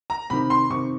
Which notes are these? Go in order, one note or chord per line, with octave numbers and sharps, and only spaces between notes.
A#5
C3 D#3 B5
C6
C3 D#3 C#6